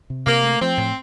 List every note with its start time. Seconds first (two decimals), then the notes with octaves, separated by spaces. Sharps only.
0.10 C3
0.26 C3 A#3
0.44 A3
0.61 F3 C4
0.78 A2